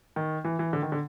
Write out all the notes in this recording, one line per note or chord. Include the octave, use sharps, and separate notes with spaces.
D#3
E3
E3
D3
D#3
D3